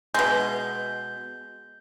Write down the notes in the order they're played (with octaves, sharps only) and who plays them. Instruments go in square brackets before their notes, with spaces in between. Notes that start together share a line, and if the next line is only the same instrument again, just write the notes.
[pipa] B2 G#3 [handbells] G6